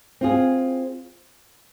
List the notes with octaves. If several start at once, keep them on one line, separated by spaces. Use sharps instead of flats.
C4 F4 G#4